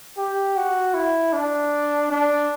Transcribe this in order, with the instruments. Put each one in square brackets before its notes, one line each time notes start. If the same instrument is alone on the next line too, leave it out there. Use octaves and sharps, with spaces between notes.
[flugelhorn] G4
F#4
E4
D4
D4